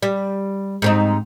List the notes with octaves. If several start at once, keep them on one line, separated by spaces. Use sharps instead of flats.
G3
G#2 C4 D#4